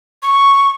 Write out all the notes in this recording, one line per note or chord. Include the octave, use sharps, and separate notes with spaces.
C#6